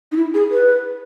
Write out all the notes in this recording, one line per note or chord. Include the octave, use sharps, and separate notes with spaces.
D#4
E4
G#4
B4